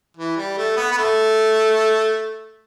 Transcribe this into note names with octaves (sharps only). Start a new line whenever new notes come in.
E3
G3
A3
B3
B3
A3